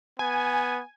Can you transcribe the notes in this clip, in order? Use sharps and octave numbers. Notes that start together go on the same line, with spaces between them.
B3 G#5